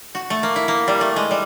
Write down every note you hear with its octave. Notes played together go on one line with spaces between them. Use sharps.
F#4
A3
A#3
E4
A#3
G3
A3
G#3
G3